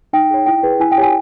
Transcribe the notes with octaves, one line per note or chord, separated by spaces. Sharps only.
D#4 G5
G#4 C#5
E4 G5
G#4 B4
E4 G#5
G5
G4 C#5 G#5